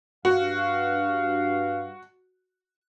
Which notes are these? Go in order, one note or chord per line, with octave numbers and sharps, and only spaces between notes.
G2 F#4 F5